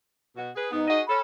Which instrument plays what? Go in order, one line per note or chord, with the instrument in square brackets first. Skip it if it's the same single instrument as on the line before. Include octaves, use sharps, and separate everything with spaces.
[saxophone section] B2 F#4
G#4 B4
[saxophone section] G#2 B3 [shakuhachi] D#4
[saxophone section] F#4 G#4 D#5
[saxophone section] C#4 A4 [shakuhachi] B5